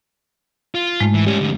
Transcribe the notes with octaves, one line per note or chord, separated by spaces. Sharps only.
F4
G#2 G#3 A3
E3
G3 C#4 G4
F2 D3